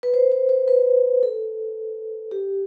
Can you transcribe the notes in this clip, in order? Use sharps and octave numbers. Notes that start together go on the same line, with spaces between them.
B4
C5
C5
C5
B4
A4
G4